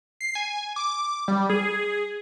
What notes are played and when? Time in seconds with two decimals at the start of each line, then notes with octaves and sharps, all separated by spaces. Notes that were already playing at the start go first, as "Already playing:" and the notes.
0.21 C7
0.35 G#5
0.76 D6
1.28 G3
1.50 G#4